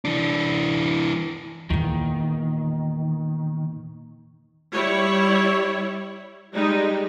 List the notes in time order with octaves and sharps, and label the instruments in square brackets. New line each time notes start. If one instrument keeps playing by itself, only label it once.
[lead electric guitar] E3 D4
[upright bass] E2 A#2 [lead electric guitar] D#3
[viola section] G3 E4 C#5
G3 G#3 D#4